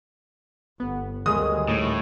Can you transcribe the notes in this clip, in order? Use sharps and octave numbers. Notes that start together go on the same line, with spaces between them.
G1 B3
D2 D#3 G3 G#3 C#4 D#6
A2